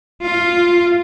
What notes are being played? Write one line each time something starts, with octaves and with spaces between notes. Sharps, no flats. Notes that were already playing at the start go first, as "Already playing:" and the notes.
F4